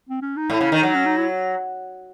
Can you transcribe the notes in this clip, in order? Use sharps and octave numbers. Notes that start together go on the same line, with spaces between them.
C4
C#4
D#4
A2 E4
C#3
D#3 D#4
F#3
C#4
D#4
E4